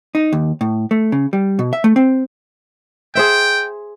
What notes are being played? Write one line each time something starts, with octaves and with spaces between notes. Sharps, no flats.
D#4
D#2
A2
A3
C#3
G3
B2
E5
A3
C4
G#4 C5 E5 G5